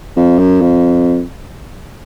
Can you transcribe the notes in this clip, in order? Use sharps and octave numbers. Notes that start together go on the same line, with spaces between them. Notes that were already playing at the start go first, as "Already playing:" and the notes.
F2
F#2
F2